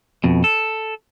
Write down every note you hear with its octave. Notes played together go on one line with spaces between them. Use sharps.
F2 B2
A4